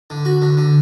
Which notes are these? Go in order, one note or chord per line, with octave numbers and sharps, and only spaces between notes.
D3
F#4
D3
D3